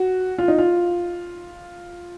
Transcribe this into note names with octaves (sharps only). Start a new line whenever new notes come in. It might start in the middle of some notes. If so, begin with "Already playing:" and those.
Already playing: F#4
F4
D#4
F4